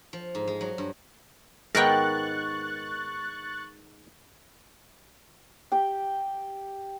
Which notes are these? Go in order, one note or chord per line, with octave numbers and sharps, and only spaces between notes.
F3
G#2
G#3
F#3
G2
G#2 D#3 B3 A#4 G5 C#6 F#6 A6
G4 G5